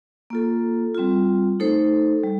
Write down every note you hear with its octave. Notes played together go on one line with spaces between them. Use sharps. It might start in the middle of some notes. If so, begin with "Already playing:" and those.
A#3 F4 A4
G3 C4 F4
A3 D#4 A4 C5
G3